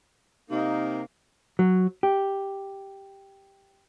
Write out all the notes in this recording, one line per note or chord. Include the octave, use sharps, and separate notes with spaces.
C3 A#3 D#4
F#3
G4